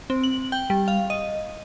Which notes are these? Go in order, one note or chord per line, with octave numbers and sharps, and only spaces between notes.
C4
F#7
G5
G3
F5
D#5